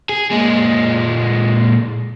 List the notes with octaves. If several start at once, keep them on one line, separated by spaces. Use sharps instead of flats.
G#4
A#2 G#3